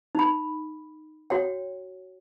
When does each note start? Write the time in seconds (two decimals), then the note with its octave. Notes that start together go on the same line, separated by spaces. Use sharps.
0.15 D#4 B5
1.30 F#4 C#5 G5